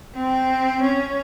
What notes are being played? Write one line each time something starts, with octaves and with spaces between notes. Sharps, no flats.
C4
C#4